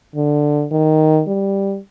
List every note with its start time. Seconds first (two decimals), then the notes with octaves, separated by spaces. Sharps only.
0.15 D3
0.71 D#3
1.27 G3